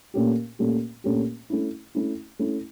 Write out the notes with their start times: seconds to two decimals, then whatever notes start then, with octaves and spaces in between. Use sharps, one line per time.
0.14 A#2 A3 C#4 G4
0.59 A#2 A3 C#4 G4
1.04 A#2 A3 C#4 G4
1.50 A3 C#4 E4
1.95 A3 C#4 E4
2.39 A3 C#4 E4